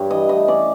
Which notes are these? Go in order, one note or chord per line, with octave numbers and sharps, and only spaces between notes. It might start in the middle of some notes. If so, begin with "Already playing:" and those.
Already playing: G2 G3 C#5
E3 D#5
A2 D#5
C#4 D5